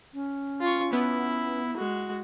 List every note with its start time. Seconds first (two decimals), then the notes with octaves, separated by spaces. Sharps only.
0.14 C#4
0.61 F4 C#6
0.93 B3 E4
1.77 G#3 F#4